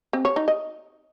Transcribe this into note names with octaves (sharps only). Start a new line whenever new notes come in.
C4
C#5
D#4
D#5